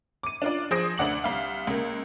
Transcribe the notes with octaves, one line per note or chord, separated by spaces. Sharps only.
D6 D#7
D4 F4 D5
F3 G#4 C5 D#6 A#6 D7
D2 D4 F#5 D6 F#7
C2 F5
C#2 A#3